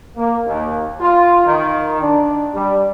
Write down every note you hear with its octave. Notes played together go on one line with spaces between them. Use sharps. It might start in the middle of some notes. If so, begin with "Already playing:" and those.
A#3
D#2
F4
D#3
D4
G3